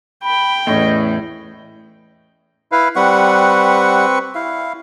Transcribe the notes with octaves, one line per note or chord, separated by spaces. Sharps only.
G5 B5
E2 A2 C#4 D#5
E4 B4 F5
G3 C4 B4 F#5 C#6
E4 F5